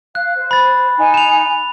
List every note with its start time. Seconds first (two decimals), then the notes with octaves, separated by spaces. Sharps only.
0.15 F5 F#6
0.36 C5
0.51 B5 A6
0.98 D#4 G#5
1.14 E7 F7